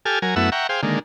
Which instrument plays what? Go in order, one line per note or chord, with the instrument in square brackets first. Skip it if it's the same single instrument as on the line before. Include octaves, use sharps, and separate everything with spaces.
[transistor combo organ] G4 A4 G#5 F6
F#3 A#4 G#5
F#2 A3 B3 E4 F#5 E6
E5 F#5 G5 A#5 C#6
G#4 C5 F5 G5
D3 D#3 G#3 A#3